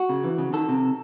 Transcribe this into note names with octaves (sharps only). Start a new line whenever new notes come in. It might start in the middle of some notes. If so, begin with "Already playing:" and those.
Already playing: F#4
C#3
E3
C#3
D#3 A4
C3